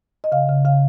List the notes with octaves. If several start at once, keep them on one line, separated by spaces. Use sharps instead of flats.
D#5
C#3 F5
C#3
C#3 F5